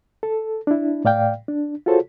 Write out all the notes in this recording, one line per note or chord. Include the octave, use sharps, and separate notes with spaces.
A4
D4 E4
A2 D5 F5 G5
D4
F4 F#4 G#4 A4 C5 C#5